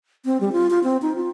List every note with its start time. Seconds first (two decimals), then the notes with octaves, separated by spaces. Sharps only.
0.25 C4
0.40 G3
0.52 F4
0.70 F4
0.84 C4
1.02 D#4
1.16 F4